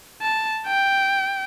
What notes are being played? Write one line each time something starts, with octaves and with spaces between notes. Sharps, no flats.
A5
G5